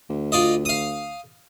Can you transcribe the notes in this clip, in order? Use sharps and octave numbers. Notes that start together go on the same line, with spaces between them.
D2
F4 D5 D#5
F5 D#6